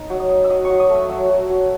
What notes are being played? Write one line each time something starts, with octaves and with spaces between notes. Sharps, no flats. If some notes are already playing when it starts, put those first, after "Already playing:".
Already playing: D#4
F#3
D#6
D#4
E6
F#3 D#6
C#6
F#3
D#6
A3 E6
F#3 E6
F#3
F#3